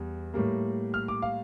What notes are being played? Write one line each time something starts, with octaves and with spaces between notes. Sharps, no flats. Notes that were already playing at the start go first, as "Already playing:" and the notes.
Already playing: E2 G3
A2 G3 A#3
F6
D6
F5